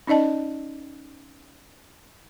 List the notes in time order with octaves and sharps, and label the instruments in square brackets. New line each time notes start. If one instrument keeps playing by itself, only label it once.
[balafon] C#4 D#4 D5 D#5 A5